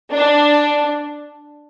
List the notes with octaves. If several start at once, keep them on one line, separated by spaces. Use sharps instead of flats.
D4